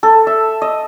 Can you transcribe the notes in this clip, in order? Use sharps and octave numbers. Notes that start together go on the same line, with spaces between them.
A4
E5
D#5